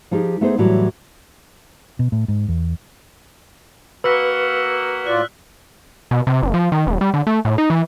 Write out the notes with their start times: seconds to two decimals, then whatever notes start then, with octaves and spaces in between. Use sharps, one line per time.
0.11 F3 D#4 G4 G#4
0.41 A3 B3 D#4 G#4 A4 C5
0.58 A2 E3 F#3 G3
1.99 B2
2.12 A2
2.28 G#2
2.48 E2
4.04 A#3 F#4 B4 E6 F6 B6
5.07 A2 F4 D5 F#6
6.11 B2
6.27 C3
6.42 F#1
6.54 F3
6.72 D#3
6.87 D#1
7.01 G3
7.14 D3
7.27 A3
7.45 A2
7.58 D#4
7.70 E3